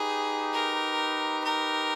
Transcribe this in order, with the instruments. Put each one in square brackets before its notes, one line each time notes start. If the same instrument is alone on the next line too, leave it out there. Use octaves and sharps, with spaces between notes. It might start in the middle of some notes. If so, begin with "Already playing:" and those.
Already playing: [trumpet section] D#4 G4 B4 [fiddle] G#4
[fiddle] A#4
A#4